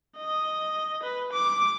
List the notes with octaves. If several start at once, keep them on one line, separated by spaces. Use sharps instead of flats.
D#5
B4
D6